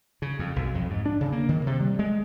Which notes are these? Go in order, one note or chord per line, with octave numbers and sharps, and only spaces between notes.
C#3
F2
B1
F2
G#2
D4
C#3
A#3
D#3
C3
G3
G#3